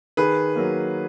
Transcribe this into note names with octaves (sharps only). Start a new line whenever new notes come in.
D#3 G#4 B4
F#3 A#3